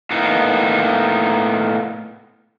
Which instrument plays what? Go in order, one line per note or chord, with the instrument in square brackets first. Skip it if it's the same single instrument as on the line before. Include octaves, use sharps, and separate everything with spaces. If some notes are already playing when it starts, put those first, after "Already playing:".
[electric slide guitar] A2 A#3 B3 D#4